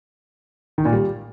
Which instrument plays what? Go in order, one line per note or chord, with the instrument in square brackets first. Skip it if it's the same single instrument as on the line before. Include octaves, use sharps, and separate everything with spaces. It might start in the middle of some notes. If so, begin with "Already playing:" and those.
[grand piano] D#3
A#2
G3